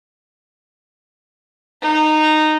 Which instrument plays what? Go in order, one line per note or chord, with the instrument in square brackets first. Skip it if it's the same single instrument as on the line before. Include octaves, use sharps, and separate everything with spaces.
[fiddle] D#4